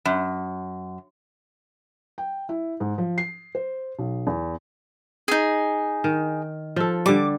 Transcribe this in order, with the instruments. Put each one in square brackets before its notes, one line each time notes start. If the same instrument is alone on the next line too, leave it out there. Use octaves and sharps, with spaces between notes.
[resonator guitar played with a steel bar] F#2
[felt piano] G5
E4
G#2
F3
C7
C5
B1
E2
[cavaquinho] D#4 G#4
[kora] D#3
F3 A4
[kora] D3 G3 [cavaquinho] D6